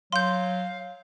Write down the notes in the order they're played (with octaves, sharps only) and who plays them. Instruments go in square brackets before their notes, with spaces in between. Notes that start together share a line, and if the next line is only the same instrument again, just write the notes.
[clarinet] F#3 [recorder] F5 [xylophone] C6 G6